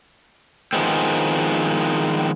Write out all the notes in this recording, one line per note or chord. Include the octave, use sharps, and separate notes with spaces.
D#3 F3 G#3 B3 C4